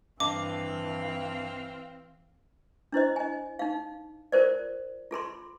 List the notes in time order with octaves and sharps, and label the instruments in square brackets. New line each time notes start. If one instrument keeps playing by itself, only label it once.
[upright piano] G2 D#5 A5 [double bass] E3 [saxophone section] C4 F5 [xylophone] D6
[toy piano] D4 E4 C5 D#5
D#5 G#5
D#4 F5
F4 A#4 C5 D5
F4 A4 B5 C6